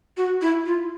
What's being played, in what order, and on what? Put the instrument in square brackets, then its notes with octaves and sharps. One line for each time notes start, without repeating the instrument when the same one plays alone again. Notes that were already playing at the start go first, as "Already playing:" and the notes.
[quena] F#4
E4
F4